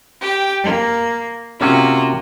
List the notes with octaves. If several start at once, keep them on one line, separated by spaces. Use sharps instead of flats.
G4 G5
A#3
C3 A#3 C#4 F4 F#4